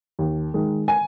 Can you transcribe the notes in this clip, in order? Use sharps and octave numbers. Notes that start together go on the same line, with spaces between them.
D#2
D#3 G#3
G#5